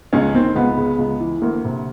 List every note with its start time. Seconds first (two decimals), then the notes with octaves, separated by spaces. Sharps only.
0.13 C#2 C#4
0.34 D#3 C4
0.55 C#2 B3
0.77 C#3
0.99 C#2
1.20 E3
1.42 D2 A#3
1.64 C3